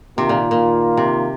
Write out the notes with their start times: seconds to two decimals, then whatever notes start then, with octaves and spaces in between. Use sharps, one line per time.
0.17 C3 D#3 A#3 F4
0.29 A#2
0.51 A#2
0.97 C3